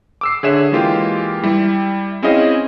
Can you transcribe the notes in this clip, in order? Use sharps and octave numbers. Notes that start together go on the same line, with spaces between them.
D6 E6 C7
D3 G#4 C#5 E5 E7
E3 G#3 A#3 F4 G4
G3 E4
C4 C#4 E4 G#4 D#5 F5